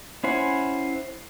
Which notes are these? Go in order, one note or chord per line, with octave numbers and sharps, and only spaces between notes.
C#4 E4 C5 F#5 G#5